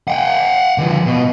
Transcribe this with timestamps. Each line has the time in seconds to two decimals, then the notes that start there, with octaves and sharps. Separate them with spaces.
0.08 F#5 G5
0.78 D3 F3
1.06 B2